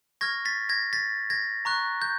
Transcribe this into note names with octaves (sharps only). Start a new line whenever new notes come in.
C#6 F6 G#6 A#6
A6 B6
G#6 A#6
A6 B6
G#6 A#6
A#5 C#6 F#6
G6